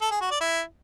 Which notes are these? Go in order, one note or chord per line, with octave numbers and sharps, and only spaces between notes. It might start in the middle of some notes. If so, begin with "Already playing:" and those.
A4
G#4
F#4
D5
E4